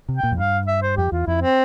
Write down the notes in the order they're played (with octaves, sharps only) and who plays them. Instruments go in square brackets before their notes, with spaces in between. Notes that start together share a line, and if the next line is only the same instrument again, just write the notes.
[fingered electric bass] C3
[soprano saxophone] G5
[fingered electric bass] A#2
F2
[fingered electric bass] G2 [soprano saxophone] F5
[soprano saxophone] E5
C5
[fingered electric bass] F2 [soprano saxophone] G4
[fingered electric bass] E2 [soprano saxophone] F4
[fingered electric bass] F2 [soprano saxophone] E4
[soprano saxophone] C4